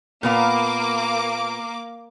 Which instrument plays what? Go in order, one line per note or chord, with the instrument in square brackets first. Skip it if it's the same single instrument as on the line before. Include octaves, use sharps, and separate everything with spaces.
[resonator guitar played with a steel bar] A#2 B3 F5 [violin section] A#3 D6